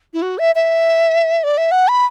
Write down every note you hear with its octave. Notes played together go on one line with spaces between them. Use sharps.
E4
F#4
E5
E5
D5
E5
F#5
B5